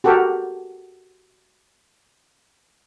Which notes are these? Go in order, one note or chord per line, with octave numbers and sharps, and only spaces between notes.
F#4 G4 A4 A#4